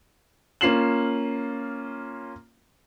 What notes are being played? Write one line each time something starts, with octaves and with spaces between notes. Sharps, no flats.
A#3 C#4 F4 C7 E7 F#7